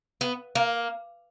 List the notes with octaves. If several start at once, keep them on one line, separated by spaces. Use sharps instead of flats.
B3
A#3